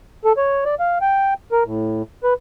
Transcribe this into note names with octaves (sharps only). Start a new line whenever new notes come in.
A4
C#5
D5
F5
G5
A#4
A2
B4